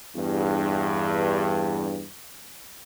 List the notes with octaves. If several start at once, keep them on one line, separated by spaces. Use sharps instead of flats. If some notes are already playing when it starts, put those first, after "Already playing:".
E2 G2